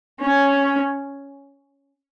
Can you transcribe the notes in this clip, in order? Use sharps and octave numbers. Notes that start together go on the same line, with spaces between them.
C#4